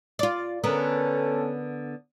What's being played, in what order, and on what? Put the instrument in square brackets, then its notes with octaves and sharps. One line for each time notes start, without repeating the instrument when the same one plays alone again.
[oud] F4 D5
[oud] D3 B3 A#4 [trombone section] C#4 A4